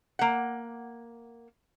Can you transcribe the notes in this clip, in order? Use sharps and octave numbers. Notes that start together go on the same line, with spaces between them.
A#3 F#5